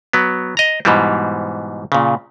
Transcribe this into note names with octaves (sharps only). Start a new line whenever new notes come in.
F#3 B3
D#5 A#5
G#2 B2 E3 G3
A#2 C#3